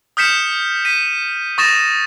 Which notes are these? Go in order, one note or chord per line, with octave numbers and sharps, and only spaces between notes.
D#6 F6 G6 B6 C#7 E7
B6 D#7
C#6 D#6 A6 A#6 E7